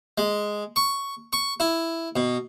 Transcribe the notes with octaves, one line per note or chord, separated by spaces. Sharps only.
G#3
C#6
C#6
E4
B2